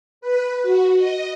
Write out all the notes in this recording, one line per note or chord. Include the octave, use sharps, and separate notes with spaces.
B4
F#4
D#5